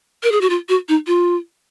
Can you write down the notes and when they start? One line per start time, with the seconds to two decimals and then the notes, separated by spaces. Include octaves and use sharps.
0.23 A#4
0.32 G#4
0.41 F#4
0.50 F4
0.69 F#4
0.89 D#4
1.07 F4